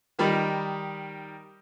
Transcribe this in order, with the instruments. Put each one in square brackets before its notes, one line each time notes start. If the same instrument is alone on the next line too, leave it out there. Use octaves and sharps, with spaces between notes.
[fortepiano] D#3 G3 D#4 B5